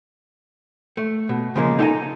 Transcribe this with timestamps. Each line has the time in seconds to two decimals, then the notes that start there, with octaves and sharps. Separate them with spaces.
0.97 A3
1.29 B2
1.56 C#3 F3 G#3 A#3
1.79 D#4 A4 E5 G5 G#5 A#5